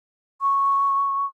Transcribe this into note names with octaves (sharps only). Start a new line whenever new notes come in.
C#6